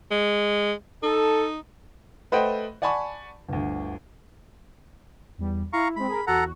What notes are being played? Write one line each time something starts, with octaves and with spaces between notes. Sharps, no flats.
G#3
D#4 A4
A3 B4 C5 D#5 F#5 G5
D5 F#5 G#5 A5 B5 C#6
G1 D2
E2 G3
E4 F5 A#5 C#6
G#3 C4 B5
G#4 A#4
E2 F#4 A4 F#5 A#5